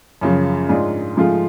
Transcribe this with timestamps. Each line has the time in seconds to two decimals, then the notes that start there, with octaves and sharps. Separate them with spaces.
0.21 F#2 C#3 F3
0.69 G#2 G#3 D4 F4 G#4
1.17 G#2 F3 A3 F4 G#4